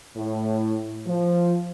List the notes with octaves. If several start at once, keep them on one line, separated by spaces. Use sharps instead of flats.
A2
F3